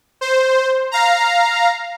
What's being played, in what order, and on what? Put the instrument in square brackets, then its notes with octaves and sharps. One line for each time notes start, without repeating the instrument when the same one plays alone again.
[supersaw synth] C5
F5 A#5